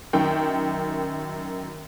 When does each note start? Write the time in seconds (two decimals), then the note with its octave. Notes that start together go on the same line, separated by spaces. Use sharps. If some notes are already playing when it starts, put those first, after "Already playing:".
0.13 F#2 D#3 G5